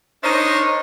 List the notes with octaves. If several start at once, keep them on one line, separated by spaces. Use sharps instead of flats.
D4 D#4 A#4 C5 C#5 D#5